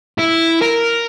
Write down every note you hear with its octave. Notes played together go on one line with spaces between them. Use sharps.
E4
A#4